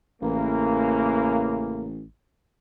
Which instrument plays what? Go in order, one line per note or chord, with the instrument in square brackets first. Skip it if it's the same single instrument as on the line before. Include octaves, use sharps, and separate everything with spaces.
[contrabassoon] A1 [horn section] C#3 E3 A#3